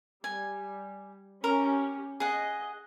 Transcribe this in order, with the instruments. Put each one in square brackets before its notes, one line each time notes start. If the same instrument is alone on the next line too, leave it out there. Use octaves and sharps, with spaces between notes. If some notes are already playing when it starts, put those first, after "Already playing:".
[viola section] G3 [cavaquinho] G#5
[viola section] C#4 G4 [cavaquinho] A#4
[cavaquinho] G#4 F#5 [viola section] D#5